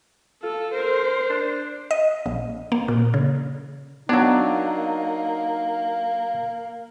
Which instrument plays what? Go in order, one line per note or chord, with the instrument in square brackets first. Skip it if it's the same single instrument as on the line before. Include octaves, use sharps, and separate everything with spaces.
[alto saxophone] F4 [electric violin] A4
[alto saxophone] A#4 [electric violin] C5
[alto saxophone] D4
[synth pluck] D#5
A#1
A#3
A#2
C#3
[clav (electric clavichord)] F#3 D4 [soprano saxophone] A#3 [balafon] B3 [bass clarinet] D#4